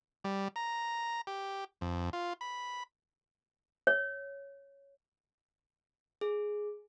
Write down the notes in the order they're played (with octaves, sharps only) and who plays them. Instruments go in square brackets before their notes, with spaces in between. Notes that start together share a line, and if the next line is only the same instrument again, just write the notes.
[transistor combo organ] G3
A#5
G4
F2
F4
B5
[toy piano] C#5
[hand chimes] G#4